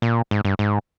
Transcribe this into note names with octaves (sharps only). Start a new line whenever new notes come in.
A#2
G#2
G2
G#2